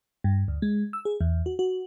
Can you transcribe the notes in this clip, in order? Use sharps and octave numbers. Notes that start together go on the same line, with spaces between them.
G2
D2
G#3
E6
G#4
E2
F#4
F#4